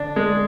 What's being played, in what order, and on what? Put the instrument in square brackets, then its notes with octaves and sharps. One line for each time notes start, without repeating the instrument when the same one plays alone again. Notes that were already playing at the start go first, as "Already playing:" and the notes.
Already playing: [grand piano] D3 [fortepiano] D4
[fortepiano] G#3